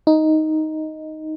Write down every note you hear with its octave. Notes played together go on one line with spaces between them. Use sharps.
D#4